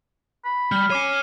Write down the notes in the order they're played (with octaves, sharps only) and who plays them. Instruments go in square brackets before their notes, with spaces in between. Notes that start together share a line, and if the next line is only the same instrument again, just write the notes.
[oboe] B5
[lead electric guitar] G3 [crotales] F6
[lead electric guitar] C#5 G#5 [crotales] D6 C7 D#7